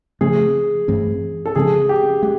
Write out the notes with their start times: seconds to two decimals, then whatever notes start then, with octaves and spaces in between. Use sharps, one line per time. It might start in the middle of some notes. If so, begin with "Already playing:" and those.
0.21 C#3 F3 A3 C4 G#4
0.88 G2 E3 A3 C4
1.46 A4
1.56 C#3 F3 G#3 C4 G#4
1.89 G4
2.22 G#3 G4